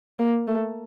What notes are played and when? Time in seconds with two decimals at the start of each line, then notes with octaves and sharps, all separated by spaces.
0.19 A#3
0.48 A3